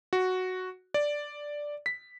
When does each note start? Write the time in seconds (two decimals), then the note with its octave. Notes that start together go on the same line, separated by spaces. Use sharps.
0.13 F#4
0.94 D5
1.86 B6